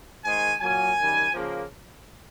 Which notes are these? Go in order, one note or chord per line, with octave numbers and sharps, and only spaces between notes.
G#2 D#3 G#3 G#5
A#2 F#3 A#3 G#5
F#2 D#3 G3
C#3 F3 A#3